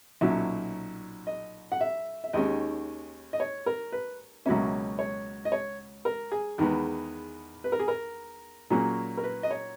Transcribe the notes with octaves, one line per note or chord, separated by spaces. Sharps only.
B1 A#2 F#3 C#4 E5
D#5
F#5
E5
E5
D#2 D#3 G#3 C#4 D#5
D#5
C#5
A#4
B4
C#2 B2 F#3 A#3 C#4 E5
C#5
D#5
C#5
A#4
G#4
E2 D#3 G#3 B3
B4
A#4
G#4
A#4
A#2 F#3 A#3 C#4 G#4
A#4
B4
D#5
C#5